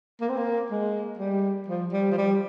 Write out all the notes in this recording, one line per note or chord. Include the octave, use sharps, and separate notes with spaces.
A#3
C4
A#3
G#3
G3
F3
G3
F3
G3